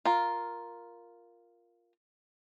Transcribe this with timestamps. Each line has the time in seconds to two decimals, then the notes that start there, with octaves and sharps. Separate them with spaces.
0.05 F4 A#4